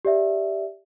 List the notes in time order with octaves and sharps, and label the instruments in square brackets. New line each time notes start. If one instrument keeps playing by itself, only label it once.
[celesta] G4 D5 E5